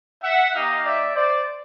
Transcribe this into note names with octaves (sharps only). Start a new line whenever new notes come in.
E5 F#5
A#3 D#4 G4 D#5 F5
D5 E5
C5 D5